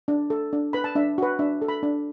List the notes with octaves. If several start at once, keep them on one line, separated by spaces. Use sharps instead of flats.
D4
A4
D4
B4 B5
A5
D4 E5
F#4 B4
D4 E5
A4
B5
D4